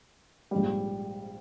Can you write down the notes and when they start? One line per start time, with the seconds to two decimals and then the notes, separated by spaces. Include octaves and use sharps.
0.51 A#1 G#2 G3